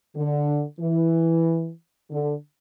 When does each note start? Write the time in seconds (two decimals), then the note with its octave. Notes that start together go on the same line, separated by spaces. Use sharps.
0.16 D3
0.81 E3
2.10 D3